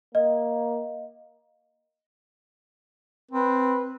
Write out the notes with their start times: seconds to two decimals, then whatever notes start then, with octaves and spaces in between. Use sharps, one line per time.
0.15 A#3 D#5
3.31 C4 B4